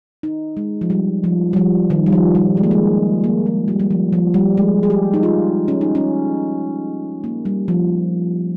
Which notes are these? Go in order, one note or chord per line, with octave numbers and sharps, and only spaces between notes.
D#4
G#3
F3
G3
F3
G3
F3
D#3
G3
F3
G3
G#3
A#3
G#3
A#3
G#3
G3
G3
F3
F3
G3
G#3
G#4
G4
D#4
F4
C#4
D#4
C#4
A#3
G3
F3